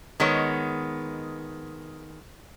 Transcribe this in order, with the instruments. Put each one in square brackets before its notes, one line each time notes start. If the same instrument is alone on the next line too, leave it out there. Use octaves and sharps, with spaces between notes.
[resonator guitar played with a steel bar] D#3 G#3 B3 C#5